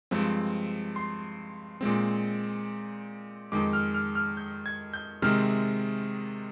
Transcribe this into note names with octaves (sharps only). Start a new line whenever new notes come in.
G2 F3 G#3 C4
C6
A#2 G#3 C4
F2 D#3 G#3 D6
F6
F6
F6
G6
G#6
G6
C3 D#3 G#3 C4 F6